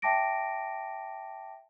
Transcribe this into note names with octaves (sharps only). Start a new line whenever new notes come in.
E5 G5 A5 D6 A#6 D7